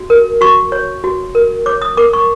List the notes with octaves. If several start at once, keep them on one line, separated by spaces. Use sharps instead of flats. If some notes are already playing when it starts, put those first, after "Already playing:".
Already playing: F#4
A#4
F#4 C#6
C#5
F#4
A#4
C#5 D6
D#6
A#4 D6
C#6